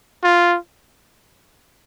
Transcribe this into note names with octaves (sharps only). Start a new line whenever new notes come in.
F4